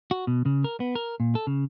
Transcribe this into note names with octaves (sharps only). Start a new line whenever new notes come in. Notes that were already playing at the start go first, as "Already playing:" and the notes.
F#4
B2
C#3
A#4
B3
A#4
A#2
A4
C#3